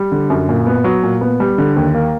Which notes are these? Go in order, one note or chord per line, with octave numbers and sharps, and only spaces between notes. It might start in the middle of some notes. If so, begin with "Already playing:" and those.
Already playing: G3
D3
F#2
A#2
B3
F#3
A#2
B3
G3
D3
D#2
A#3